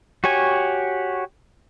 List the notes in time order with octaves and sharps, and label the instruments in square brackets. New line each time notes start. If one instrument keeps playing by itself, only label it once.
[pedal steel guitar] F#4 G4 C#5 G#5